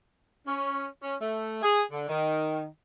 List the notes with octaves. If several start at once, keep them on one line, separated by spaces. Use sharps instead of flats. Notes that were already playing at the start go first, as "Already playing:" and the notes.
C#4
C#4
A3
G#4
D3
D#3